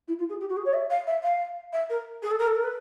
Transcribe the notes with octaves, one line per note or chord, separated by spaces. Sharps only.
E4
F4
G#4
G4
F#4
G#4
C#5
E5
F5
E5
F5
E5
A#4
G#4
A4
A#4
A4
A#4
B4